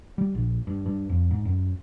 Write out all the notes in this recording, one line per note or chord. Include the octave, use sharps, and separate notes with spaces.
G3
A#1
G2
G2
F2
G#2
F#2